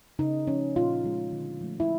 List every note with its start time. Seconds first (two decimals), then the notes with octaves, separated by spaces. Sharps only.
0.19 C#3 D#4
0.47 F3 A3 C#4
0.76 A#2 F4
1.04 F3 G#3
1.32 D3
1.61 F3 A3
1.80 E4